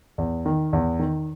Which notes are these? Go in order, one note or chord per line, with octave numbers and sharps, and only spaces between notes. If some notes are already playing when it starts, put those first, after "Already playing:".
E2
D#3
E2
D#3